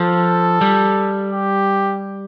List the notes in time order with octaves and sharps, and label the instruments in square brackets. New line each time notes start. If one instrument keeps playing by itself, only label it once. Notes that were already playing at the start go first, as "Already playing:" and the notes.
Already playing: [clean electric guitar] F3 [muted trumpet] A4
[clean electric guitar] G3
[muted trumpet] G4